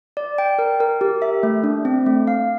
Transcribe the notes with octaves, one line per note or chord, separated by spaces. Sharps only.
D5
G5
A#4
A#4
G4
E5
A3
D4
C4
A3
F5